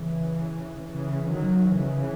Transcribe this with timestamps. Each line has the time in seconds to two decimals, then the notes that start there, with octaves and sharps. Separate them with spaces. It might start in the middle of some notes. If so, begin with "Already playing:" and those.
Already playing: C#3 E3
0.91 C#3 E3
1.31 D#3 F#3
1.70 C#3 E3